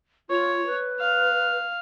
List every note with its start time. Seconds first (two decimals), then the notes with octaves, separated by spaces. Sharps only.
0.30 F4 C#5
0.66 B4
0.99 F5